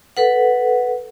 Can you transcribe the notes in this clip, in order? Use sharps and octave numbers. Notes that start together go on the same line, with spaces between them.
A4 B4 F#5